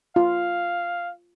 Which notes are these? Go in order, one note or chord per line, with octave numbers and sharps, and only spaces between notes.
F4 F5